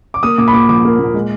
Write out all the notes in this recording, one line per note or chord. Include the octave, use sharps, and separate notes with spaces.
D6
A#3 D#6
A#2 D6
B5
A#2 D6
F3 D6
A#3
A#2
G#3